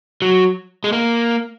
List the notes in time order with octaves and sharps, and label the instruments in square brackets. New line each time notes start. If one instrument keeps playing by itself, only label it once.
[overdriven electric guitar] F#3
G#3
A#3